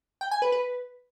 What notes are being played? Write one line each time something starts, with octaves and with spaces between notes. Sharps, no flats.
G5
G#5
B4
B4